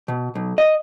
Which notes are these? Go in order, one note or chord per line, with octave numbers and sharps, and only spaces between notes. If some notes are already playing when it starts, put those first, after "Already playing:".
B2
B1
D#5